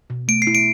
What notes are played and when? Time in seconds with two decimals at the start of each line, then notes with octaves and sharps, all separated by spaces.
0.10 B2
0.28 A3 D7
0.42 C7
0.47 E4
0.55 D7